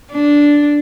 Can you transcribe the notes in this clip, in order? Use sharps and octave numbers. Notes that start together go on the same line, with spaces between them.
D4